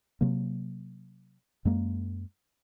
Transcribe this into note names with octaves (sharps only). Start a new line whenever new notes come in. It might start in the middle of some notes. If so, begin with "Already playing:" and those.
C3 F#3 A#3
F#2 G#3 A#3